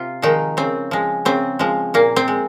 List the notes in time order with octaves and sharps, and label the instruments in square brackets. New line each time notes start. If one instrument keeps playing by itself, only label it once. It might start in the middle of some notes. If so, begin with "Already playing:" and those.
Already playing: [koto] C3 F4
D#3 F3 G#3 D#4
C#3 C4
F3 G#3
C#3 C4
F3 G#3
A#2 A#3
C4
G#3